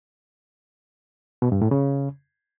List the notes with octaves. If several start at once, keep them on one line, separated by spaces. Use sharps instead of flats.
B2
G2
A2
C#3